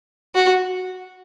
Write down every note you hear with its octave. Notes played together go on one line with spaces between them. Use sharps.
F#4